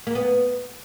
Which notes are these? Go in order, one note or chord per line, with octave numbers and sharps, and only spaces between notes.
A#3
B3